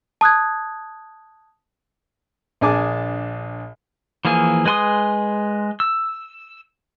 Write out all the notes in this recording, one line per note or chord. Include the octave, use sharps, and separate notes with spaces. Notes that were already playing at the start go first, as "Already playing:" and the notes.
A5 D#6 F#6 G#6
A#1 D4 G#4 G#5 A5 D6
E3 F3 A#3 G#4 G#5
G#3 B4 G#5 C6 D#6
E6